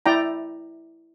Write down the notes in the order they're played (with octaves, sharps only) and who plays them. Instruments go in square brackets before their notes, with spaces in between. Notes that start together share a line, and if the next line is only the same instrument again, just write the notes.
[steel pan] E4 D5 G5 A#5